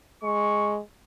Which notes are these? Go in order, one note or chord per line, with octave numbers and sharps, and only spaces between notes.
G#3 C#6